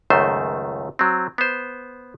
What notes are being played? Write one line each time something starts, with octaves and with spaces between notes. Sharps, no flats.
C#2 F#2 D#3 A3 C5
F#3 C4
B3 C5